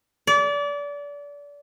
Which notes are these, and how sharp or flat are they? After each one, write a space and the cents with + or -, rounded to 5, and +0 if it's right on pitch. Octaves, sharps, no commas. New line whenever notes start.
D5 -30